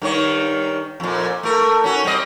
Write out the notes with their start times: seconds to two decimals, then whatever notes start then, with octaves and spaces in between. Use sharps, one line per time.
0.02 G2 D#3 C#5
1.00 F2 A#2
1.43 A3 A#4
1.84 C#4 F#4
2.04 G3 C4 D#5